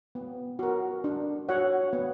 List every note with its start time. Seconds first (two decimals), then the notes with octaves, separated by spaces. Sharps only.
0.15 B3
0.59 F#4 A#4
1.04 D4
1.49 F#4 C#5 F#5
1.93 B3